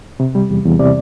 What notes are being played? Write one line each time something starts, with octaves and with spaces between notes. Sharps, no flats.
C3
G3
E2
E2
C3 D5